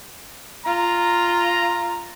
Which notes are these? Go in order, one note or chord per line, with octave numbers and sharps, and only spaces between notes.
F4 A#5